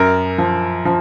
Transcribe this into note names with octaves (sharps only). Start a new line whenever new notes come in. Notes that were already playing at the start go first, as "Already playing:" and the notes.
Already playing: F#2 A#4
F3
F3